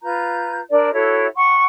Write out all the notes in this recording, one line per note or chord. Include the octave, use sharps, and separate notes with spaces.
F4 B4 A#5 G6
D4 A#4 C5 D5
E4 F#4 A4 C#5
F#5 G5 C6 C#6